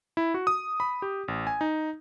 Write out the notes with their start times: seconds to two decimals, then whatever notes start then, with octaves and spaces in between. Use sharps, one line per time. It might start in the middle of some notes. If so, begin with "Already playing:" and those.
0.17 E4
0.34 F#4
0.47 D#6
0.80 B5
1.02 G4
1.28 A1
1.47 G#5
1.61 D#4